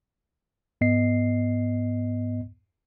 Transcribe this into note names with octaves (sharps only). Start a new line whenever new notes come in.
G#2 B3 D#5 C7